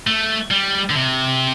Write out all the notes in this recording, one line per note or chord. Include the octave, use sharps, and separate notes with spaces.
A3
G3
D3
C3